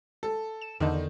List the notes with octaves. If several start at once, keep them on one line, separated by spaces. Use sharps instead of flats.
A4
E7
E2 D3 D#3 D#4